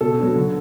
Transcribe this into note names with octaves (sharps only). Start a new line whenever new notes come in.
B2 A4
F#3 B3 D4
D3